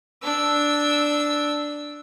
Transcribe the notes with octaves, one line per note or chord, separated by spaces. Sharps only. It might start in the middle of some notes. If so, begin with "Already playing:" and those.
D4 E6